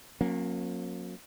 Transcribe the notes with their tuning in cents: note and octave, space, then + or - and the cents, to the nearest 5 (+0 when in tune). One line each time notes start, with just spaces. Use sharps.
F#3 -40 A#3 +0 C#4 -35